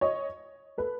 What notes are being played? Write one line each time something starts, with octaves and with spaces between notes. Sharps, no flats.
C#5 D#5
A4 B4